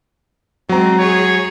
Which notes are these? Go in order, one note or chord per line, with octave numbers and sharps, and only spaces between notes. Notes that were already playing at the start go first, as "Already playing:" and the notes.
F#3 G#3 C4 A#5
G#4 C#5